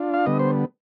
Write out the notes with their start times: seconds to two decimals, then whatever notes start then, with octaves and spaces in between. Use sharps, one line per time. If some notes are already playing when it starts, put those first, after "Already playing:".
Already playing: D4 F4
0.14 F5
0.26 D3 G3 B3 D#5
0.39 C5